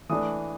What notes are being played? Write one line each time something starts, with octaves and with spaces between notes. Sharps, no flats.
E3 A3 D4 D#6